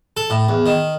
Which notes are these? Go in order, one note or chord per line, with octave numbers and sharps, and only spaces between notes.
A4
A2
E2
D#3